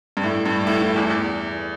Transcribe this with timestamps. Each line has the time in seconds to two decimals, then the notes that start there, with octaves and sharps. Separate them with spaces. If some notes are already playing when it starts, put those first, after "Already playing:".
0.17 G2
0.23 A2
0.45 G2
0.67 A2
0.82 A2
0.96 E2
1.10 E2